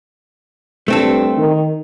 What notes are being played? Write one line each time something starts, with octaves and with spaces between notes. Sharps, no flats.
G2 A3 C4 A4
D#3